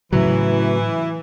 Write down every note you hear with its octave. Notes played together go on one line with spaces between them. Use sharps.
A2 C#3 E3 F#3